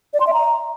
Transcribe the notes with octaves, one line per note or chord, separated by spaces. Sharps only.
D5
C6
E5
A#5